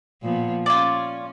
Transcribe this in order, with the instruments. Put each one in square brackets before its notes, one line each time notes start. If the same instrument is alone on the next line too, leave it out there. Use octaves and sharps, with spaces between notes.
[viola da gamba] A#2 F3 B3
[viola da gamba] C#4 [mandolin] F4 D5